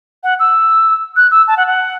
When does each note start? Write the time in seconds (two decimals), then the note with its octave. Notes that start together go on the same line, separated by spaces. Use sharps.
0.24 F#5
0.40 E6
1.16 F#6
1.31 E6
1.48 A5
1.57 F#5
1.67 F#5